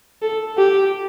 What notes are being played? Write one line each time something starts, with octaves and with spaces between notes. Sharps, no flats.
A4
G4